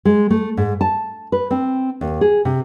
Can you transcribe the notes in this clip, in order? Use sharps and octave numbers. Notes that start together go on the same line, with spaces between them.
G#3
A3
G#2
A5
B4
C4
D#2
G#4
C3